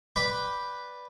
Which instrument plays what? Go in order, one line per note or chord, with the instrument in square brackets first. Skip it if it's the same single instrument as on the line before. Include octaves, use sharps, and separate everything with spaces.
[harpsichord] B4 D5 G5 B5